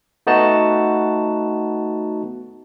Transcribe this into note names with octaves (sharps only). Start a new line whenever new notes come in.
A3 B3 D#4 F#4 A5